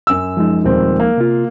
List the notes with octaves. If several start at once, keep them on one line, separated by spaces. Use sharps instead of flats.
F#2 E6
F3 G#3 D#4
D#1 C4
A#3
C3 F4